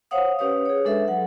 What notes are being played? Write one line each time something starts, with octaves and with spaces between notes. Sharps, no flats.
C5 C#5 F5 F#5 D#6
C#4 G4 B4 C#5 D#6
G#4 C#5
G#3 D4 A4 B4 E5
F#3 F#5